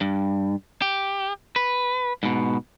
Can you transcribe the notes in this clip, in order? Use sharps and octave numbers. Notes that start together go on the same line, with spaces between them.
G2
G4
B4
G#2 B2